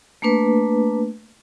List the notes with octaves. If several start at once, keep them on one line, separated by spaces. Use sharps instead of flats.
A3 A#3 D4 B4